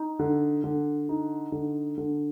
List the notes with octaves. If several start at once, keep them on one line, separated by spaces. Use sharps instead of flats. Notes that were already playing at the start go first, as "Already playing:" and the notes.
Already playing: D#4
D3
D3
D#4
D3
D3